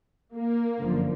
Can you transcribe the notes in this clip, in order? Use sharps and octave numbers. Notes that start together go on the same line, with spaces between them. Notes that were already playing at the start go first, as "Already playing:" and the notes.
A#3
G1 F#2 D3 F3